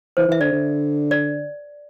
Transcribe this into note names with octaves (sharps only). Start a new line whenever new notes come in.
E3 C5
E3 E5
D3 D5
D3
D5